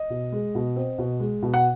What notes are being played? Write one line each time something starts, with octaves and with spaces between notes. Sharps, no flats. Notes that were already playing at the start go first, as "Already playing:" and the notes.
Already playing: D#5
B2
G#3
B2
C4
B2
G#3
B2
F#5